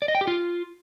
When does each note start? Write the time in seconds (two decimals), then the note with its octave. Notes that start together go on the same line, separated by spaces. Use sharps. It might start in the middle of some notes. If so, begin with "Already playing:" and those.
0.02 D5
0.08 D#5
0.15 G5
0.21 G4
0.27 F4